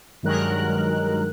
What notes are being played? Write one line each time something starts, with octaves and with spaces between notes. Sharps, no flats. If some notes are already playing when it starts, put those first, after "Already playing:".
G2 D#3 F#3 G#3 A#4 F#6